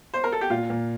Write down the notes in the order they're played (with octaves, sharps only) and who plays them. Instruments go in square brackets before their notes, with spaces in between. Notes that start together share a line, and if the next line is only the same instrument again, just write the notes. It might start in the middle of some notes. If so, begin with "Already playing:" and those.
[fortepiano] C5
A#4
A4
G4
[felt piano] A#2 [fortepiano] F4
[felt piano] A#2